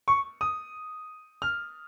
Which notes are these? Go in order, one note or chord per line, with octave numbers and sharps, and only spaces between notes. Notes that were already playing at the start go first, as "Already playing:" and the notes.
C#6
D#6
F6